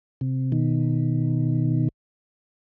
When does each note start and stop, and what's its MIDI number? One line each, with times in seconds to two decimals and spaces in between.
0.21 0.52 48
0.52 1.89 47
0.52 1.89 51